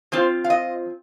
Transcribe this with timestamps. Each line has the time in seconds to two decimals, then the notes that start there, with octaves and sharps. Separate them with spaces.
0.12 F3 C4 F4 C5
0.44 F5
0.50 D#5